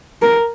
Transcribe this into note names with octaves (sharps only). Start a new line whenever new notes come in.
A#4